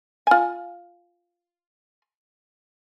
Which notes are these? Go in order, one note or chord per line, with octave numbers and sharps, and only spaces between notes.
F4 G#5